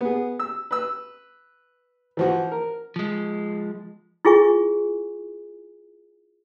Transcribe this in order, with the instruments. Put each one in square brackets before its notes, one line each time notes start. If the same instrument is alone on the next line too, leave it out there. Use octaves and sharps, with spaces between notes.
[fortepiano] B3 G#4
E6
B4 E6
E3 F3 F#4
A#4
[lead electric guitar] F3 G#3
[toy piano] E4 F4 G#4 G#5 C#6